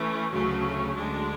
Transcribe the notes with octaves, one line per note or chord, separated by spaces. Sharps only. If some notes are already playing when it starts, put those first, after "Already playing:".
Already playing: E3 A3 C#4
D2 C#3 F#3 A3 C#4
D2 D3 G#3 D4